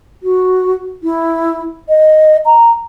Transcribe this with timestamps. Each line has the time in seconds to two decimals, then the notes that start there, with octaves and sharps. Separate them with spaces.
0.23 F#4
1.03 E4
1.89 D#5
2.46 A#5